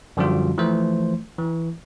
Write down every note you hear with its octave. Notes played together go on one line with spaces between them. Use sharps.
F#2 D3 F3 G3 F4 F#4
E3 F3 A3 C5
E3